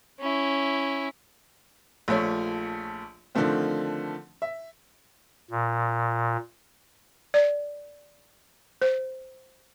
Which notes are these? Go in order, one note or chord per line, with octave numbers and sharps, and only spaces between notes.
C#4 E4
A#1 F3 A3 C#5
D3 D#3 F3 A3 C4
E5
A#2
D5
C5